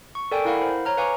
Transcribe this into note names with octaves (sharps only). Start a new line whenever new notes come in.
C#6
A4 A#4 D5 G5 G#5
E4 A#4 F5 F#5 B5
C5
C#5 A#5 F6
B4 F5 G#5 A#5 C#6 D6